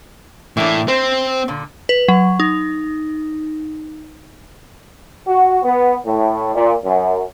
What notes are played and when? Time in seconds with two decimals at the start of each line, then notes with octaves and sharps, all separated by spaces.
0.57 A2 E3 A#3 D4
0.88 C4 C5
1.48 A#2 D3
1.89 B4
2.08 F#3
2.40 D#4
5.27 F#4
5.63 B3
6.05 A2
6.55 A#2
6.84 F#2